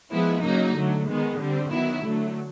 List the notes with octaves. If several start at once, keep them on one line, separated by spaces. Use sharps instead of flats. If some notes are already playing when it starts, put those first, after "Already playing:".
F3 G#3 B3 E4
C#3 F#3 A#3 D#4
D3 F#3 A3
D#3 G#3 B3
D3 G3 C4
D#3 F#3 B3 E4
D3 F#3 A3